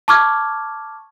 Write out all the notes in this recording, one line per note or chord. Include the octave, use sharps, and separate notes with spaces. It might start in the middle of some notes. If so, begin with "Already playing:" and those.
A5 C#6 D6 F6 G#6